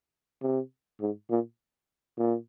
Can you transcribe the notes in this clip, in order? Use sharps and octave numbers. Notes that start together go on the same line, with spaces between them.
C3
G#2
A#2
A#2